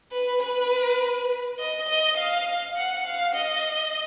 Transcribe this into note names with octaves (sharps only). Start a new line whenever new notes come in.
B4
B4
D#5
D#5
F5
F#5
F5
D#5